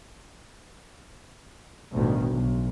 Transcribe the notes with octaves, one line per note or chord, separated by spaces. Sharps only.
A1 D2 G2 B2 D#3
B1